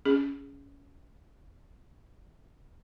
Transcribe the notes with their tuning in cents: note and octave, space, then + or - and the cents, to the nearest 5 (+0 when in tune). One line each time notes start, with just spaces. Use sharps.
C#4 +15 G#4 +0